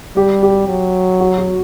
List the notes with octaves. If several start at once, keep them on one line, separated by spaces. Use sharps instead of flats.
G3 G4
G4
F#3
F#4
F#4